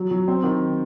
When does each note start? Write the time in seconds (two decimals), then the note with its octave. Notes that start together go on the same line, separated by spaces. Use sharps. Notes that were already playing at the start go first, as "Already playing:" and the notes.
Already playing: F#3
0.11 F#3
0.28 C4
0.43 D#3